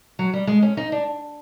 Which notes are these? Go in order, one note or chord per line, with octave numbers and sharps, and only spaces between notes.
F#3
G3
G#3
C#4
D#4
D4